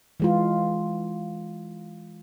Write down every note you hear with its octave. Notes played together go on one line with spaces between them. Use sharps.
E3 G#3 F4